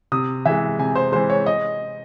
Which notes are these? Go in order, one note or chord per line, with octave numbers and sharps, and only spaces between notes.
C3 D#6
E3 G#3 E5
C3 G#5
C5
E3 G#3 C5
C#5
D#5